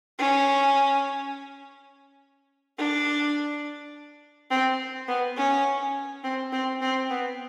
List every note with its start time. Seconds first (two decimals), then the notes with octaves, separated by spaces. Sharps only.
0.19 C#4
2.78 D4
4.51 C4
5.08 B3
5.37 C#4
6.24 C4
6.53 C4
6.81 C4
7.10 B3